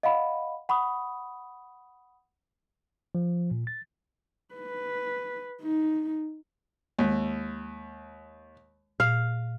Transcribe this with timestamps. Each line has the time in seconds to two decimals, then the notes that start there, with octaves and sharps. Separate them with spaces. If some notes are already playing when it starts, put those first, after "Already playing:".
0.03 D#5 F5 F#5 B5
0.69 F#5 B5 C#6 D#6
3.15 F3
3.51 A#2
3.67 A6
4.55 B4
5.62 D#4
6.99 D#2 G#3
9.00 A#2 F5